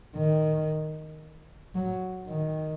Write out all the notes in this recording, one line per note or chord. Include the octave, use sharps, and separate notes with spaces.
D#3
F#3
D#3